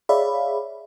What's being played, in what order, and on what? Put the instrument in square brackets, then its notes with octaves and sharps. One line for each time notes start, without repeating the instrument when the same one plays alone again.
[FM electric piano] G#4 C#5 D5 E5 F5 B5